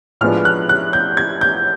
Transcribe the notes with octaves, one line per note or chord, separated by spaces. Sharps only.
A2 F3 G#3 B3 D4 F6
F#6
F#6
G6
G#6
G6